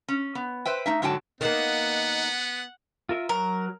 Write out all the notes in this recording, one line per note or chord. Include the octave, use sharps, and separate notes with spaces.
C#4
B3
B4 C5 E5 G5
A3 D#4 E5
G#2 D3 F#3 F#4 G5 A5
D#3 A#3 B3 D#5 F#5
F4 A#4 E5
F#3 A#4